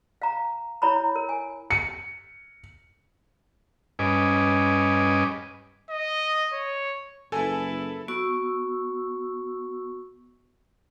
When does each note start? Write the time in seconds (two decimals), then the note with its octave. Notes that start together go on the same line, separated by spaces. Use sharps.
0.22 F5 A#5
0.82 E4 C#5 A#5 B5
1.16 A#4
1.29 G#5
1.70 C#7
3.99 G2 C#4 B4 D#5 G#5 D6
5.90 D#5
6.53 C#5
7.32 F#1 E4 A4 B4 G#5
8.08 B3 F#4 C#6 E6